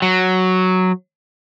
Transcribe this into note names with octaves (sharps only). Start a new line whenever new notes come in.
F#3